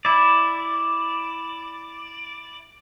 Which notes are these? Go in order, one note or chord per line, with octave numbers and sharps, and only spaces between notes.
E4 D5